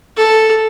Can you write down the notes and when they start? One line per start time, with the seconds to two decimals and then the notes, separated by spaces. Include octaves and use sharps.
0.17 A4